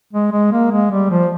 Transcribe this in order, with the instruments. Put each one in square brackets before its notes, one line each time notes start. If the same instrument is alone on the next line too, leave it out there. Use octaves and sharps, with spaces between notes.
[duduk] G#3
G#3
A#3
G#3
G3
F3